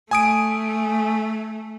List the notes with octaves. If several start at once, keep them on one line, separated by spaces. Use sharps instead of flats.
A3 G#5 D#6 D7